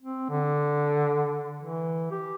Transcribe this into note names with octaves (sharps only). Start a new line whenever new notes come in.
C4
D3
E3
G4